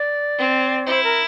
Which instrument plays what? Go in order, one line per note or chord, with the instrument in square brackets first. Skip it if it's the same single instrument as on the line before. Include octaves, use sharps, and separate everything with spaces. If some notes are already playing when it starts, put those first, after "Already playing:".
Already playing: [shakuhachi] D5
[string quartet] C4
[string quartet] E4 [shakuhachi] C5
[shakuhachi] A#4